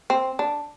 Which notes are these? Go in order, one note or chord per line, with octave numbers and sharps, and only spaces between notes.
C4
D4